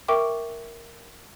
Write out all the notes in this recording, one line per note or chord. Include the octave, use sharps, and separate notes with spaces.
A#4 E5 G5 C#6 D6